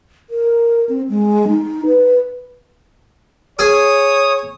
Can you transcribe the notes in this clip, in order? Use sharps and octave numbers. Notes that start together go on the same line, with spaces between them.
A#4
C4
G#3
D#4
B4
G#4 C#5 D#6